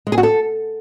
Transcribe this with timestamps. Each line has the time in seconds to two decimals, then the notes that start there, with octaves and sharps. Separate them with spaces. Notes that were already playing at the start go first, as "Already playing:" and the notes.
0.07 G#3
0.12 G#4
0.18 F#4
0.23 A4